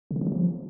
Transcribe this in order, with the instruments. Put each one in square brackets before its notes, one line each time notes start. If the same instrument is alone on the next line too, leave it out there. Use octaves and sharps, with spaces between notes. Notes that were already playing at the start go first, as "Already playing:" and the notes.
[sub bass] C#3
D3
F3
F#3
F3